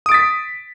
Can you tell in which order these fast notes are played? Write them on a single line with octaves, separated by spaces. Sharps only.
D#6 D7 A6 B6